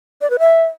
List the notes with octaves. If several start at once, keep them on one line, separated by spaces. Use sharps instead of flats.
D5
B4
E5